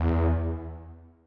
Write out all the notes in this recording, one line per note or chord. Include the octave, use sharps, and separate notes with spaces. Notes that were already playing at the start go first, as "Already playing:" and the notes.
Already playing: E2